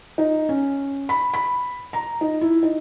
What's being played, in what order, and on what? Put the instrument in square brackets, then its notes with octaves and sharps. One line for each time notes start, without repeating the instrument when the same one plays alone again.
[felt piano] D#4
C#4
B5
B5
A#5
D#4
E4
D#4